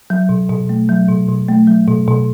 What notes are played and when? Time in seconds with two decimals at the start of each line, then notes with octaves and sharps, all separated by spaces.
0.10 F#3
0.29 B2
0.50 B2
0.69 A3
0.89 F#3
1.08 B2
1.29 B2
1.49 A3
1.67 F#3
1.88 B2
2.08 B2